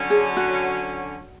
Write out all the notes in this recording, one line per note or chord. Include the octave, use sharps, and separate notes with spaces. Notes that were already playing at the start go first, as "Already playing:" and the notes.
Already playing: D3 F#3 C#4
G#4
F#4